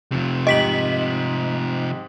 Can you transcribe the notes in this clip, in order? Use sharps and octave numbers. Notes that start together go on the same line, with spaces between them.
F1 C3 F3
G#2 G4 D#5 B6 F#7